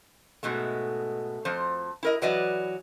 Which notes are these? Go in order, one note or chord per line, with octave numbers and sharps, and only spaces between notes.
G#2 B2 G#3 A3
F2 F3 C5
E4 A#4 D#5
E3 F#3 B4 D5 D#5